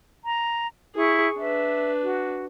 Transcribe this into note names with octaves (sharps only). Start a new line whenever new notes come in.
A#5
E4 G#4 C#6
D4 B4 E5
F#4